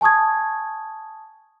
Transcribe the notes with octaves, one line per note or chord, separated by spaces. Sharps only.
G#5 A5 C#6 D#6 G#6